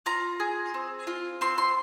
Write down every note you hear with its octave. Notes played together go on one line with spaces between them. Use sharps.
F4 A#5
G#4
C4
F4
C4 C6
C6